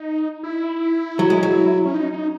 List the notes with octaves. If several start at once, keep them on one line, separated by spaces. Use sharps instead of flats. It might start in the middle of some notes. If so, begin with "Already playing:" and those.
Already playing: D#4
E4
F#3
G#3
F#3
C#4
D#4
D#4